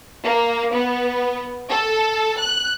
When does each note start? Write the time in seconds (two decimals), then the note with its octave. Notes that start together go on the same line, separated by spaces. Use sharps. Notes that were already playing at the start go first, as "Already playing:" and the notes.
0.25 A#3
0.73 B3
1.69 A4
2.39 F#6